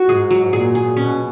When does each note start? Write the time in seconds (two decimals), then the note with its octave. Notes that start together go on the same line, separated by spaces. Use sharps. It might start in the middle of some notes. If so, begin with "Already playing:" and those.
Already playing: F#4
0.09 G#2 G#4
0.31 F#3
0.53 A#2 G#4
0.75 G#4
0.97 B2 C#4